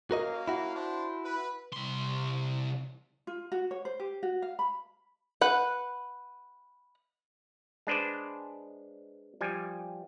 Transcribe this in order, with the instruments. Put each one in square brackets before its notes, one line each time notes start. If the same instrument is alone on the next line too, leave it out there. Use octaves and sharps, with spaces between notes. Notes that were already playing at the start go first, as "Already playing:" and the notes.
[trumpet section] A#3 C#4 F5 [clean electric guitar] F#4 A#4 D#5
[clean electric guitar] E4 F#4
[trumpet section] D4 C5
B4
[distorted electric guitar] C2 C6
[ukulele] F4
F#4
C#5
C5
G4
F#4
F5
B5
[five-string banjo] B4 F#5
[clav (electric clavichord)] G#3 D4 B4 C5 D5
F3 G3 G#5